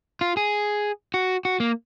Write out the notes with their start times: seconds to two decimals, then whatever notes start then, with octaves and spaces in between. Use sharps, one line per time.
0.21 F4
0.37 G#4
1.14 F#4
1.45 F#4
1.60 A#3